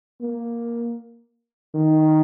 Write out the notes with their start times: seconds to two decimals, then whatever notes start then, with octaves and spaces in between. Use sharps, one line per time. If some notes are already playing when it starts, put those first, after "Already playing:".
0.21 A#3
1.74 D#3